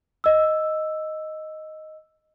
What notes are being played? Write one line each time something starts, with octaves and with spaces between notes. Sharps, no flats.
D#5 E6